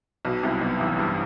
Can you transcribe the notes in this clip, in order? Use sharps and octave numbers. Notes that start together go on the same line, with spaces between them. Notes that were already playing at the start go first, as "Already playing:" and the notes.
B1 B2
C2 C3
B1 B2
A1 A2
G2